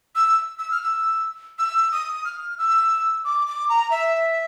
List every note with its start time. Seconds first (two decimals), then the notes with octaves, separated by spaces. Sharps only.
0.15 E6
0.59 E6
0.71 F6
0.83 E6
1.59 E6
1.92 D#6
2.25 F6
2.58 E6
3.24 D6
3.47 D6
3.69 A#5
3.91 E5